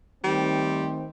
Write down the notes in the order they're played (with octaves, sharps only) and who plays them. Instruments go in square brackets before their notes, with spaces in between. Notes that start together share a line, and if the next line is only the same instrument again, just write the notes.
[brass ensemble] D#3 A3 C4 [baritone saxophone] G3